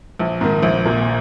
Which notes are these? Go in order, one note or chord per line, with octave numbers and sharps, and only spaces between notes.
A#1
G#2 D#3
A#1
A#2